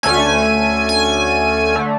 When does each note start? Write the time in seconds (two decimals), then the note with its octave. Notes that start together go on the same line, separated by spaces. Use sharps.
0.03 D2 D3 A3 C#4 G#5
0.89 G#5
1.75 D3 A3